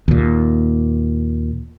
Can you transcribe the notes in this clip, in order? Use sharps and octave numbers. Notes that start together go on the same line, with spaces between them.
D#2 A#2